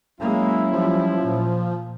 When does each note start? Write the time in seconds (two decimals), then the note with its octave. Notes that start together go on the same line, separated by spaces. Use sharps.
0.20 F#3 G#3 A#3 C#4 E4
0.73 F3 G3
1.21 A#2